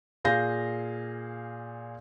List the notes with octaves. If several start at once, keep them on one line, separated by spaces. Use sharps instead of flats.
A#2 G#4 F5 G6 A#6